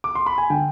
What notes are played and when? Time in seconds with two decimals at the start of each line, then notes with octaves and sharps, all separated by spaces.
0.04 D6
0.15 C6
0.26 B5
0.38 G#5
0.50 D3 G5